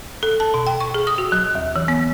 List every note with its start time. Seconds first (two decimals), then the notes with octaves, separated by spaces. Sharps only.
0.23 A4
0.40 A5
0.54 B2
0.67 G5
0.80 C#6
0.94 G#4
1.07 D#6
1.18 F#4
1.32 F#3
1.55 D#2
1.76 E3
1.88 B3